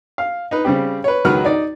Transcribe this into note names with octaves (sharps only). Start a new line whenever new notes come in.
F5
D#4 B4
C#3 G3 C4 G4
B4 C#5
C#2 D#3 F#3 F#4 B4 F6
D#4 D5